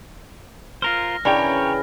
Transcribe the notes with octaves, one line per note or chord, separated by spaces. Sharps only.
F4 A#4 C5 F6 A#6
C#3 E3 C#4 D4 A#4 C#5 G5 B5